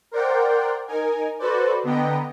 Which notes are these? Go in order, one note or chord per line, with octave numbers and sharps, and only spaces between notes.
A#4 C5 D5 F#5 G5
D#4 A#4 G#5
F#4 A4 B4 C5 D5
D3 B3 D#5 G5 A#5